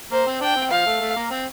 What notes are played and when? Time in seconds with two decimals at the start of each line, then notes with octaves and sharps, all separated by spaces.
0.11 A#3 C5
0.27 C4
0.41 D4 G5
0.56 C4
0.71 F3 F5
0.86 A3
1.01 A3
1.16 A#3
1.31 C4